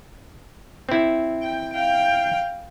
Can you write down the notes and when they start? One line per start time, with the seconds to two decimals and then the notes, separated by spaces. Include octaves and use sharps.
0.89 C4 E4
1.42 G5
1.74 F5 G5